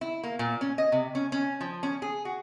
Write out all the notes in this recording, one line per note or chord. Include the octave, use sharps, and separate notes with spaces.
E4
A#3
A#2
C#4
D#5
C3
C#4
C#4
F3
C#4
G#4
F#4